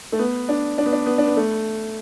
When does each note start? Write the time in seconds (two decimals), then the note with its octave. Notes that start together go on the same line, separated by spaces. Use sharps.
0.12 A3
0.19 B3
0.49 D4
0.78 D4
0.86 B3
0.93 D4
1.06 B3
1.18 D4
1.27 B3
1.37 A3